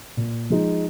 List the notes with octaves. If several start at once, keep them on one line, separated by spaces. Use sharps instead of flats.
A#2
F3 G#3 D#4